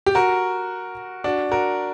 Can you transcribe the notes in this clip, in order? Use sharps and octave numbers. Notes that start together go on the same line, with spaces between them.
G4
F#4 A#4
D4 F#4
F#4 A#4